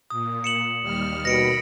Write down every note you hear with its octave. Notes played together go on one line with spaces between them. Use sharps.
A#2 D#6
C#7 E7 F#7
D#2 G3 F6
D#2 B2 B5 A#6 C#7 D7